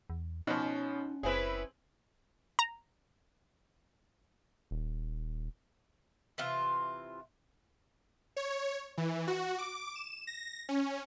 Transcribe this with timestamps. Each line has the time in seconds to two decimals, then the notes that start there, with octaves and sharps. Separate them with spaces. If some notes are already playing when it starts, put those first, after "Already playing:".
0.10 E2
0.47 B2 F3 C#4 D#4
1.23 F#1 C4 C#4 E4 G#4 B4
2.59 A#5
4.71 D#1
6.38 C3 E3 F4
8.37 C#5
8.98 E3
9.27 F#4
9.58 D6
9.95 E7
10.27 A#6
10.69 C#4